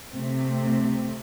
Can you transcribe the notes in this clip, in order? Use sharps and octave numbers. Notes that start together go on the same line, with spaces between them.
C3 A3 C4